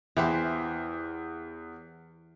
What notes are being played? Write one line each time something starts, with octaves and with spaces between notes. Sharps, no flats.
E2 E3 G4 C5